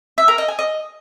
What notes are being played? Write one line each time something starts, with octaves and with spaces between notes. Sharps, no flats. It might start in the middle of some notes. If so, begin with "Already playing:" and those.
E5
A#4
D#5
G#5
D#5